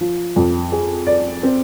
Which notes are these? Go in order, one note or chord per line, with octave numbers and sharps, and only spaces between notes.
F3
F2
G#4
D5
C4